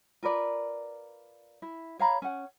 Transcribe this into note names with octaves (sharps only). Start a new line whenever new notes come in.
F4 A#4 B4 D5
E4
C#5 F5 A#5 B5
C#4 F#5